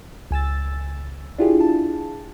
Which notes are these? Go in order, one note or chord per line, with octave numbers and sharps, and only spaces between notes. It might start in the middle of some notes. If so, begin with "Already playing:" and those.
C#2 G#5 E6 A6
D4 E4 F4 G4 G#4
A5